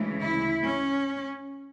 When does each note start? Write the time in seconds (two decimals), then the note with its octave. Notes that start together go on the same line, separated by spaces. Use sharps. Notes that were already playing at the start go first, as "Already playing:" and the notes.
Already playing: D2 C#3 E3 G#3
0.22 E4
0.65 C#4